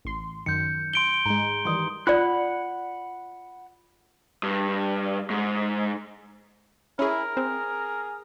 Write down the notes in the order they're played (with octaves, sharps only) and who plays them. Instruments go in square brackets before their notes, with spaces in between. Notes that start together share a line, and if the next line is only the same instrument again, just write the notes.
[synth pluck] A1 C6
[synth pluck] F#2 D#3 [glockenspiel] G6 C#7
[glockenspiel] C6 D7 G7
[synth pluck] G#2 G#3 [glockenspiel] A#5 G7
[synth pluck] D#3 E3 G3 [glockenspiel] C6 D#6
[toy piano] F4 D5 [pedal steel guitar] F#5 B5 F#6
[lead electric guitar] G2
G#2
[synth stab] C#4 G#4 [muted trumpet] E4 [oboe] A#4
[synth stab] C4 [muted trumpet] G#4